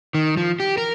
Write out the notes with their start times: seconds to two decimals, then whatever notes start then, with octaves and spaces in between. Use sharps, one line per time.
0.15 D#3
0.37 F3
0.60 G4
0.78 A#4